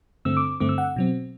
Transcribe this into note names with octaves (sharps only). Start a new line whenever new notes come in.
G2 D3 A3 C4 E6
D6
G2 D3 A3 C4 D6
E6
F#5
B2 F#3 C4